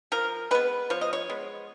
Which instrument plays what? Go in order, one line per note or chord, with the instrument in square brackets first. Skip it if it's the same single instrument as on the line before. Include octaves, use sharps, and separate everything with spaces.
[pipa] F3 A#4
G#3 B3 B4
F3 C#5
D#5
C#5
G#3 B3